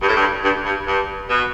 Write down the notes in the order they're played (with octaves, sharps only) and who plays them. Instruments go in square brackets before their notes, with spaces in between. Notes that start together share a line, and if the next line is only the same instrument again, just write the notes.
[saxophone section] G2
A2
G2
G2
G2
G2
B2